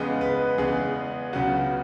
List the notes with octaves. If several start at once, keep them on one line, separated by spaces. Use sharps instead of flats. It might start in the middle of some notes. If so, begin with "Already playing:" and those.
Already playing: E2 C#3 G#3 B3 G#4
B4
E2 C#3 G#3 B3 G#4
C#2 C#3 F#3 B3 F#4